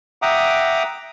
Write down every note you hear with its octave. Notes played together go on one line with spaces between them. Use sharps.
E5 F#5 G5 A#5 D6 D#6